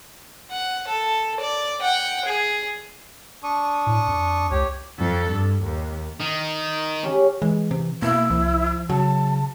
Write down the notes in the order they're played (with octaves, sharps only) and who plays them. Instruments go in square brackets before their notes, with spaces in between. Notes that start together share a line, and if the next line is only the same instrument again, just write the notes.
[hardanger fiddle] F#5
A4
D5
F#5 G5
G#4
[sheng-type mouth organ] D4 C#6 D#6
[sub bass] A2
F2
[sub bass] C#2 [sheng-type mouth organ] G4 C#5
[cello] F2 A4
G2
D#2
[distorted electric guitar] D#3
[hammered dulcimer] C#4 G4 G#4
[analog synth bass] E3 [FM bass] G#3
[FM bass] C3
[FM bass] B2 [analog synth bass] A#3 [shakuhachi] E4
[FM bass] C2 [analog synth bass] F3
[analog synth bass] C#3 [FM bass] F#3 [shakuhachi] A5